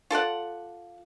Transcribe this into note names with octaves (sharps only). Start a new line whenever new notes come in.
F4 A4 D5 F#5